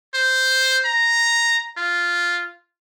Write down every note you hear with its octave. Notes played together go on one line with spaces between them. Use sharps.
C5
A#5
F4